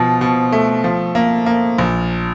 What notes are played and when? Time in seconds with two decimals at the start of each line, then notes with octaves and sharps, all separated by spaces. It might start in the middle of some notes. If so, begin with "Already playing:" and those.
Already playing: B2 F3
0.21 B2
0.52 A3
0.84 F3
1.15 A#3
1.46 A#3
1.78 A#1